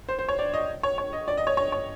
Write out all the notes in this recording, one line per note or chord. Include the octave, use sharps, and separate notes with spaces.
C5
C5
C#5
D5
D#5
C#5
C#5
D#5
D5
D#5
C#5
C#5
C#5